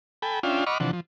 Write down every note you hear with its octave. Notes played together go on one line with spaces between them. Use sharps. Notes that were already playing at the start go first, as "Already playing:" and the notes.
A4 G5 G#5 B5
C#4 D4 F4 E5 F5 G5
D#5 F#5 B5 C#6 D6 F6
C3 E3 F3 D4 F#5
F3